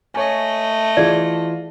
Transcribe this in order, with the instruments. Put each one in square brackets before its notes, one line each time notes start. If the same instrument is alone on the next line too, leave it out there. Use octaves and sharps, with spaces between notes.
[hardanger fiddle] A3 D#5 [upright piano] C#5 G#5
[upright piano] E3 F4 [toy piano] G#4 D5